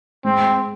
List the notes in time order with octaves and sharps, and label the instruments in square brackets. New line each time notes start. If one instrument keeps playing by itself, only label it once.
[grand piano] G#3 [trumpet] C4